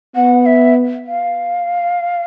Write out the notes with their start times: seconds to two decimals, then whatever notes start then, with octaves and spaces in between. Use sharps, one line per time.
0.16 B3 F#5
0.46 E5
1.07 F5